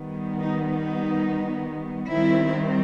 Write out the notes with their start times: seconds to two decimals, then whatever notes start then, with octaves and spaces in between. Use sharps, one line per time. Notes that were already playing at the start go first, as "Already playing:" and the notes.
Already playing: D#3 G3 B3
0.40 D#4
0.68 D#4
2.10 D#3 G3 C4 E4